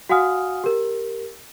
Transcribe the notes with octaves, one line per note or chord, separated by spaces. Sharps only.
F#4 F5 F#5 G#5 D#6 F6
G4 A#4